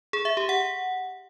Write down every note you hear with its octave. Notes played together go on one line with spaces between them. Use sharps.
G#4
E5
G4
F#5